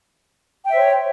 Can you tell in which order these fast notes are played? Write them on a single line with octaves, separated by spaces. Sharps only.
G5 E5 C5 C#5